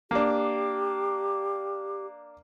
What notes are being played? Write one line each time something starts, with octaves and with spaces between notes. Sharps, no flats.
A#3 D4 G4